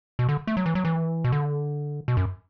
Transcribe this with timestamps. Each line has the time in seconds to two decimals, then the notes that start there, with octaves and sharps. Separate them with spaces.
0.19 B2
0.29 D3
0.47 A3
0.57 F#3
0.66 E3
0.75 F#3
0.85 E3
1.24 B2
1.32 D3
2.08 B2
2.17 F#2